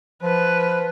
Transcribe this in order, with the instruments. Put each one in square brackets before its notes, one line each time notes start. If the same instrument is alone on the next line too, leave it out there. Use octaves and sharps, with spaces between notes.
[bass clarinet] F3 [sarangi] B4